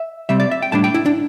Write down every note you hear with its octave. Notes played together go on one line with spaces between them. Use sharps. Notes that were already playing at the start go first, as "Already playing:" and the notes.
Already playing: E5
C3 G3 C4 E5
D5
E5
G5
A2 G3 D4 A5
G5
E4
D4